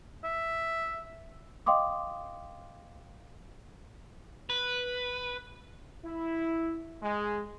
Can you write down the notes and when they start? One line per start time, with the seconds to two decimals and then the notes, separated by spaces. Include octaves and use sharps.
0.24 E5
1.66 D#5 F5 G5 C6 D6 D#6
4.50 B4
6.04 E4
7.01 G#3